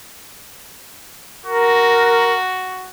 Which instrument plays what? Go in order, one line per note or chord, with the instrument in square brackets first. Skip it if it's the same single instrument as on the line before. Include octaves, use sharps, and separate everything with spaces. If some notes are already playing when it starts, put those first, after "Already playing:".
[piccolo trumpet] F#4 [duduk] A#4